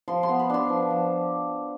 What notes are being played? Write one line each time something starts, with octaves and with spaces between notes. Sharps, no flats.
F3 C6
C6
B3
B5
D4 C6
F3
F3